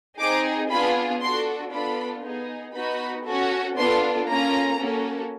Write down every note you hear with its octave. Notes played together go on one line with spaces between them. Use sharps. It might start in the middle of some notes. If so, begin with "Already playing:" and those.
C4 D#4 G#4 D6
B3 D4 F4 G#4 B5
D4 F#4 A4 C6
B3 D4 F4 A4 B5
B3 D#4 G#4
B3 D#4 F#4 B5
C#4 F#4 A4
B3 D4 F4 A4 C6
A#3 C#4 F4 A4 A#5
A#3 C#4 F#4 A4